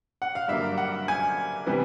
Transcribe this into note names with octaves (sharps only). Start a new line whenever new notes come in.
F#5
F5
G2 D3 F#3 A#3 E5
F#5
G#5
C3 E3 G3 B3